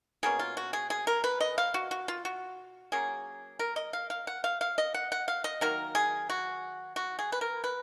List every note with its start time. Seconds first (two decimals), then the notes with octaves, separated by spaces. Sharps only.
0.23 B2 A#3 C#4 G#4
0.39 F4
0.57 F#4
0.73 G#4
0.90 G#4
1.07 A#4
1.24 B4
1.40 D#5
1.58 F5
1.74 F#4
1.91 F#4
2.08 F4
2.25 F#4
2.92 F#3 A#3 C#4 G#4
3.59 A#4
3.76 D#5
3.93 F5
4.10 F5
4.27 F#5
4.44 F5
4.61 F5
4.78 D#5
4.94 F#5
5.12 F#5
5.28 F5
5.44 D#5
5.61 D#3 F#3 A#3 A#4
5.95 G#4
6.30 F#4
6.96 F#4
7.19 G#4
7.32 B4
7.41 A#4
7.64 B4